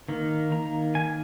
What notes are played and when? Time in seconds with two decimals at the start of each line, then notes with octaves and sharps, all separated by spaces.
0.09 D#3 A#3
0.52 A#5
0.95 G#5